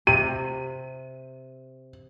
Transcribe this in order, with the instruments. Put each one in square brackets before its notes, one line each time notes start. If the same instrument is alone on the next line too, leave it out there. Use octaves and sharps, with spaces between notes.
[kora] C3 [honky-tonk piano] D#7